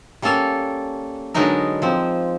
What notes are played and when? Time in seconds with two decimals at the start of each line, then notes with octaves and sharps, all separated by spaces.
0.22 G3 A#3 C#4 A4 F5
1.34 D3 F#3 G#3 B3 D#4 A#4
1.82 F3 C4